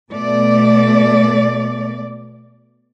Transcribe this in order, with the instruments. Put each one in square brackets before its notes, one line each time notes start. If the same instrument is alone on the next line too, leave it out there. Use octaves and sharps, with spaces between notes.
[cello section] B2 A3 D5